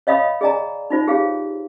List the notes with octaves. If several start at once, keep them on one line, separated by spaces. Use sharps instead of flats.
C#5 D#5 F5 B5 D#6
G#4 D5 D#5 G#5 A#5
D#4 F4 C5
G4 G#4 C#5 F5